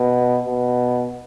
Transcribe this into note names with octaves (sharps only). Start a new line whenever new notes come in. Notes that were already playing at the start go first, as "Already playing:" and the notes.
Already playing: B2
B2